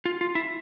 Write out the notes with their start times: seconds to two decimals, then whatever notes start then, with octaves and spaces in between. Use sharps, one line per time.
0.05 F4
0.21 F4
0.35 E4